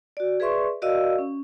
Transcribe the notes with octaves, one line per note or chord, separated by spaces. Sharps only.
F#4 D5
G#4 B4 D5 E5 C6 C#6
F#4 A#4 D5 D#5 F5 E6
C#4